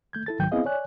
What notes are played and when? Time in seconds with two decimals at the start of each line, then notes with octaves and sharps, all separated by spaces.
0.13 A3 G6 G#6
0.26 E4 A4 A6
0.39 C2 G#2 D#3 F#3 G5 G6
0.51 B3 C4 E4 G#4 D#5 F5
0.65 C#5 D5 G#5 F#6